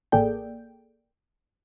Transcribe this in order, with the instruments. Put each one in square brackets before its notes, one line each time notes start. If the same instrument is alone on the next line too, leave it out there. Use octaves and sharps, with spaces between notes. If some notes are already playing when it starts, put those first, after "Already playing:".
[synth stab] A1 A#3 G#4 A4 D5 G5